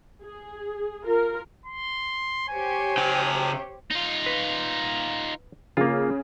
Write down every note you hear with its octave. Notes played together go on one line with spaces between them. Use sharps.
G#4
F4 A#4
C6
G4 C5 C#5 G#5
C#3 G5
D#4 F4
B4
C#3 A#3 F4